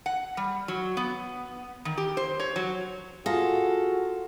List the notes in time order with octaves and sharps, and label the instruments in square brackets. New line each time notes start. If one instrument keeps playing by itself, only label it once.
[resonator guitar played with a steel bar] F#5
G3
F#3
B3
D#3
G4
C5
C#5
F#3
[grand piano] F4 [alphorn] F#4 [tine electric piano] G#4 A#6 [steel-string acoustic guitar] A4